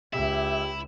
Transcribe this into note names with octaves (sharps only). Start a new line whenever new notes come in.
C#2 E4 G4 E5